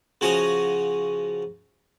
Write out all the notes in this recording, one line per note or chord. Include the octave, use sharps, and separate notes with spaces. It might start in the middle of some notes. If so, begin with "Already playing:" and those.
C#3 F3 F#4 G#5 A#5 D#6